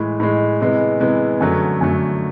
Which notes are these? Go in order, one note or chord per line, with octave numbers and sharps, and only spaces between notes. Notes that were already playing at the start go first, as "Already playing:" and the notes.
Already playing: A2 E3 G#3
A2 E3 G#3
C3 E3 G#3 B3
C3 E3 G#3 B3
F#2 D3 F#3 A3
F#2 D3 F#3 A3